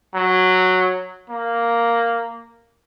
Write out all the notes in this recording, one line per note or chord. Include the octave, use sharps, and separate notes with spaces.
F#3
A#3